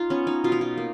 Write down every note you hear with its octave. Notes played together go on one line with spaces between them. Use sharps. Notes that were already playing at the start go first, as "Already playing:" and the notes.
Already playing: D#4 F4
B3 C#4
D#4
B2 F4
D#4
F4
A#3